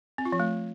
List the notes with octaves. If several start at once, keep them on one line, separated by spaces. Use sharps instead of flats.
C4
F4
F3
A3